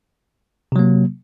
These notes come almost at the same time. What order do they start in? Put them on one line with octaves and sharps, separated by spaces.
C3 F#3 A#3